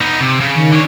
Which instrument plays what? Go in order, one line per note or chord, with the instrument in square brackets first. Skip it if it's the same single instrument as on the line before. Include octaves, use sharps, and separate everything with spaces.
[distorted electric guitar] B3 D#4
C3
C#3
[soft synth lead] D#3
[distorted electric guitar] D3 C#5